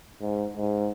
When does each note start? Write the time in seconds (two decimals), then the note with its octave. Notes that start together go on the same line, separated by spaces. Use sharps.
0.21 G#2
0.57 G#2